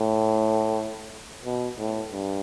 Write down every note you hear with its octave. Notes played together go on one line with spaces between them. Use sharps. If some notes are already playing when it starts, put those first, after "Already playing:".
Already playing: A2
B2
A2
G2